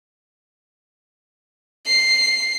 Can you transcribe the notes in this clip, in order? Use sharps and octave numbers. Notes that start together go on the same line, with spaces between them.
C7